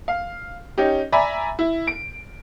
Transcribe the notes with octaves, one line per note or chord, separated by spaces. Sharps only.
F5
C#4 D#4 G4
D5 E5 G#5 A#5 B5
E4
D7